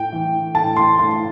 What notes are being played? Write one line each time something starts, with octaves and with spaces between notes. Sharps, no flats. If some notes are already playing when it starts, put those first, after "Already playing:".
Already playing: A2 G5
E3
A2 A5
C6
A2 C6